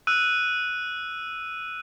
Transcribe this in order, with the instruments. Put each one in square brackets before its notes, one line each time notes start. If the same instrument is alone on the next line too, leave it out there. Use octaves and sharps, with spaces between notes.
[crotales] E6 F#6 D#7